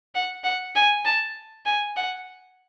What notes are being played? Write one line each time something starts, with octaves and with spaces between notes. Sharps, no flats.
F#5
F#5
G#5
A5
G#5
F#5